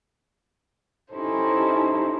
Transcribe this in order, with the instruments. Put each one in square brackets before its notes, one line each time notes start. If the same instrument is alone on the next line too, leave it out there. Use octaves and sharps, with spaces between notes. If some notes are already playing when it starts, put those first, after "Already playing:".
[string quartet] C#4 D#4 E4 G4 A4 C5